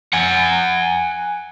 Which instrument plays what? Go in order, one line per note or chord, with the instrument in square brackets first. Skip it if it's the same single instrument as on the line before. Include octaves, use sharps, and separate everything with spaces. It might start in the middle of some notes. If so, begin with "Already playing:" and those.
[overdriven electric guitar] F#5 G#5